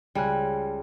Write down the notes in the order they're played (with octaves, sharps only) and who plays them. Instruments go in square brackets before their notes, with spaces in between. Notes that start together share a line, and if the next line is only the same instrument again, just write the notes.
[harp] C#2 G#5 F#6 [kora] G3